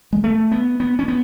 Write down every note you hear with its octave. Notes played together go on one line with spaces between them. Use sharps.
G#3
A3
B3
B3
C#4
B3